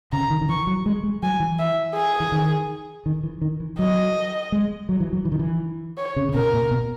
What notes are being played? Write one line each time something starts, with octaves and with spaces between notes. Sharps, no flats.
C#3 A#5
D#3
D#3
E3 C#6
F#3
G#3
G#3
F#3 G#5
E3
E5
G#4
E3
D#3
D#3
E3
D#3
E3
F#3 D#5
G#3
F#3
E3
F#3
E3
D#3
E3
C#5
C#3
C#3
B2 A#4
A#2
B2